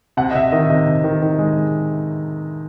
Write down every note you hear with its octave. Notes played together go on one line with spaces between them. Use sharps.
C3 F#5
D#5
C3 E5
D#3 D#5
C3 D#5
C3
D#3
D#3
G#3